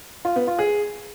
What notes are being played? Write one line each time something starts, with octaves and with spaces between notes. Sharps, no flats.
F4
B3
F4
G#4